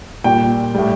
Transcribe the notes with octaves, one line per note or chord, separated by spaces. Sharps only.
A#2 G3 G5
A2 G3